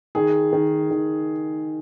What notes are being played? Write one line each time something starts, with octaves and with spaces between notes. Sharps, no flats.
D#3 G#4
D#3
D#3